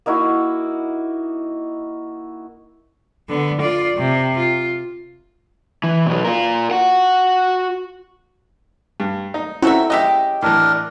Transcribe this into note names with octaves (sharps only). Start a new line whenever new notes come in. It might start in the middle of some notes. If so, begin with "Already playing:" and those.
A#3 D#4 E4 F#4
D3 B3
F4 D5
C3
F4
E3
B2 F#3
F4 A#4
F#4 F#5
G2
D#4
C4 C#4 E4 F#4 A4 E5 A#5
C#3 G#3 G4 D#5 E5
A2 E3 D4 A#4